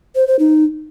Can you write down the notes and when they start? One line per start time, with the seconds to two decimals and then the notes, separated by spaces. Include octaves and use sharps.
0.15 C5
0.27 C5
0.39 D#4